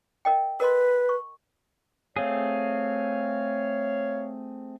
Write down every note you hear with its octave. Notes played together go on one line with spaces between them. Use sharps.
A#4 D#5 G5
A#4 B4 D#5 C6
C#6
A3 C4 G#4 C#5 F5